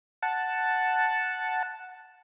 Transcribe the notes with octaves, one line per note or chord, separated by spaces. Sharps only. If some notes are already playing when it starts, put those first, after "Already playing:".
F#5 A5